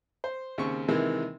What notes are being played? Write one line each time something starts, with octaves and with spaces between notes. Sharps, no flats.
C5
D#2 C#3 C4 C#6
C3 D#3 E3 G#3 A#3